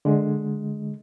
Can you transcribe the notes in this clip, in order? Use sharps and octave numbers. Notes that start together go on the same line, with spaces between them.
D3 G#3